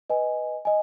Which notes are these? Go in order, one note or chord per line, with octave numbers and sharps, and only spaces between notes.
B4 D#5 G#5
D#5 G#5